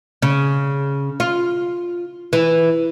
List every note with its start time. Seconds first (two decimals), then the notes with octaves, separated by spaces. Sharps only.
0.22 C#3
1.20 F4
2.33 E3